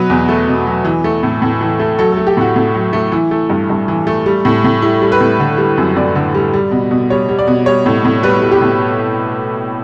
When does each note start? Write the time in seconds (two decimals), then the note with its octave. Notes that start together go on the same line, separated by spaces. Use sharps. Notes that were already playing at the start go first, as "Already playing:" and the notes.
Already playing: B2 F#3 B4
0.10 E2
0.29 A3
0.48 B2
0.66 F#3
0.85 E3
1.04 A3
1.23 A2
1.42 A2
1.61 E3
1.80 A3
1.99 F#3 A4
2.12 A3 A4
2.27 G4
2.37 A2 F#4
2.56 A2
2.75 F#3
2.93 A3
3.12 E3 E4
3.31 A3
3.50 G2
3.70 G2
3.88 E3
4.07 A3
4.26 G3
4.45 A2
4.64 A2
4.82 G3 E4
5.01 G3
5.12 B4
5.21 A2
5.39 D3
5.58 G3
5.78 F#2
5.96 F#2 D5
6.15 D3
6.34 G3
6.53 G3
6.71 B2
6.91 B2
7.10 G3 C#5
7.29 G3
7.39 D5
7.48 B2
7.66 G3 C#5
7.86 A2
8.05 A2
8.23 G3 B4
8.42 G3
8.51 G4
8.62 A2